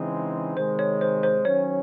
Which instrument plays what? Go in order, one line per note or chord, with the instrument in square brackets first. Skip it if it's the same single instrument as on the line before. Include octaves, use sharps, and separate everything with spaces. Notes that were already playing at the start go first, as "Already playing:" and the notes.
Already playing: [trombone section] C#3 E3 G#3 C4 D#4
[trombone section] C3 D#3 G#3 [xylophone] C5
[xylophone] C#5
C5
C5
[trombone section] D#3 F#3 C#4 [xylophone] C#5